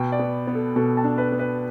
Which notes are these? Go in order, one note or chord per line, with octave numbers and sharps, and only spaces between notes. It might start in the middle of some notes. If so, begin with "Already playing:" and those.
Already playing: B2 G5
D5
B3
B3
A4
B2 A4
A5
D4
B4
B3
B4